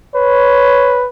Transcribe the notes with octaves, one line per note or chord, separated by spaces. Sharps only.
B4 C#5